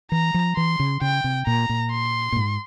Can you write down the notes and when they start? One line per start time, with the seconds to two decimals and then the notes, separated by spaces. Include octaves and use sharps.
0.12 E3 A#5
0.34 F3
0.57 E3 C6
0.80 C#3
1.01 C#3 G5
1.24 C3
1.47 A#2 A#5
1.69 A#2
1.92 C6
2.32 A#2
2.36 G#2